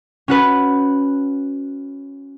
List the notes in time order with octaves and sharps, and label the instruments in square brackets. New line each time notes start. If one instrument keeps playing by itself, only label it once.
[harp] C#4 F#4 B4